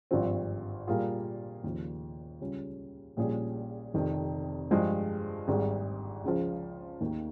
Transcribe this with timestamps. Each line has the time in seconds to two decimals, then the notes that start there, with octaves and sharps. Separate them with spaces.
0.11 G#1 G2 F3 C4 F4
0.87 A#2 G3 A#3 F4 G#4
1.64 D#2 C#3 F3
2.41 C#2 C#3 G3 C#4 F4
3.17 A#1 A#2 G3 C#4 G#4
3.94 F1 F2 C3 D#3
4.71 G2 F3 G#3
5.48 G#1 G#2 G3
6.24 C#2 C#3 F3
7.01 D#2 D#3 A#3